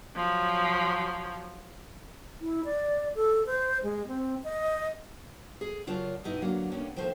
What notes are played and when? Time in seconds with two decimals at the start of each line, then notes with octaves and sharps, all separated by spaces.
0.15 F3 F#3
2.40 E4
2.65 D5
3.15 A4
3.46 C5
3.83 G#3
4.07 C4
4.44 D#5
5.61 G#4
5.87 C#3 F#3 F4 A#4 D5 A5
6.24 G2 B2 D#4 E4 D#5
6.42 D3 F#3 A#3
6.72 D#2 D3 A#3 C#4
6.96 D#3 F3 A3 C5